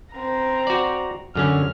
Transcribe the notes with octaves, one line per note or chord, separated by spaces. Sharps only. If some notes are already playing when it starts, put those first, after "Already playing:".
C4 A#5
F#4 D5
F#2 D3 C#4 F6